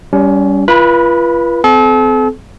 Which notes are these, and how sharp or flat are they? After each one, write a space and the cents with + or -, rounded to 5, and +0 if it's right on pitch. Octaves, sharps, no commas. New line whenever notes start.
G3 +0 C#4 +30 G4 +0
F4 -30 B4 -30 B5 +0
C4 -30 A4 -40